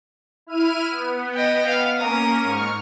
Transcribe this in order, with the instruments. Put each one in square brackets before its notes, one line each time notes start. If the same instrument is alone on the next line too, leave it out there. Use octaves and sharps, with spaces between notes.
[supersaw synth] E4 F6 D#7
B3
[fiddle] D#5 G5
F5
[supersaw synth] A#3 C#4 [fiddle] A#4 D#6
[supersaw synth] G#2 C#6 F6